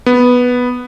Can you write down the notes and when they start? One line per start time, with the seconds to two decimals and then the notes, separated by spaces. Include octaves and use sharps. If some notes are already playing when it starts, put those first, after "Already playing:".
0.06 B3